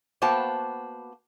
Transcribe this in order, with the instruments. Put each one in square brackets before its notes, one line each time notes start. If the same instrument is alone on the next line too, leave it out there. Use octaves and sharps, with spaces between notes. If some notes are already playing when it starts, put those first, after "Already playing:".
[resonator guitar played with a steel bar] A#3 B3 F#4 C5 G5 A5